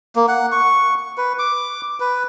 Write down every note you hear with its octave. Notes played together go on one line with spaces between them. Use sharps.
A#3
F#5
C#6
B4
D6
B4